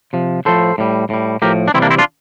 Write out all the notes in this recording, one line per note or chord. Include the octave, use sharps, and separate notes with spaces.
C3 F3
A2 F3 A4 C5
A2 G3
A2 G3
A2 F3 G4 A#4
D4
C3 E3 G3 C4 E4
A#3 D4
C4 E4
D4 F4